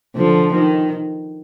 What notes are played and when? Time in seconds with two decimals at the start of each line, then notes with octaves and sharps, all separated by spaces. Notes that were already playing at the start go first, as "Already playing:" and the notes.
0.16 D3 F3
0.53 D#3